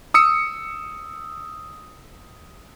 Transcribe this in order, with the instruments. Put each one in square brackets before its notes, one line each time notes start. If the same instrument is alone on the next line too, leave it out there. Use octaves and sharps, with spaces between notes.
[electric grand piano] D#6 E6 C#7